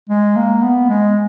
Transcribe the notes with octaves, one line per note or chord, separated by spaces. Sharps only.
G#3
A#3
B3
G#3